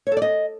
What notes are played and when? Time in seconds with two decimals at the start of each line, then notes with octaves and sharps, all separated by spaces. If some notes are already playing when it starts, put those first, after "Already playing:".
0.07 C#5
0.12 A4
0.17 D5
0.22 D#5